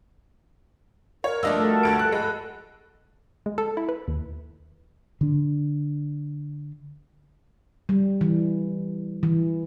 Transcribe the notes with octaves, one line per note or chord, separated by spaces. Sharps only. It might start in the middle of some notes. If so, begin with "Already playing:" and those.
A#4 C#5
G2 F3 A3 D4 D#5 E6
F#4 A4
D2 D7
F#6
G#3 B5
G#3
A4
E4
B4
D#2
D3 D4
G3
E3
E3